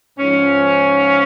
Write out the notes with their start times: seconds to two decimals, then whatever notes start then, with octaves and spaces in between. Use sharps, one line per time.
0.19 G#2 F3 C#4